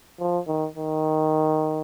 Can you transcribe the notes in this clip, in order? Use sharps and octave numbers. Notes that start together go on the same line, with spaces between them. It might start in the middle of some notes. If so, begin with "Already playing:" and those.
F3
D#3
D#3